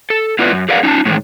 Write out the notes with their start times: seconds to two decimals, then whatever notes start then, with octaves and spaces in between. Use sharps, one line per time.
0.10 A4
0.39 A3 B3 E4 F4 B4 D5
0.52 F#2
0.69 G#4 A#4 B4 D5 F5 F#5
0.83 C#4 D#4 F4 F5 A5
1.05 A2 D#3 E3 G#3